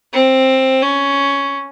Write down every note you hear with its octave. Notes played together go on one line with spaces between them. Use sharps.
C4
C#4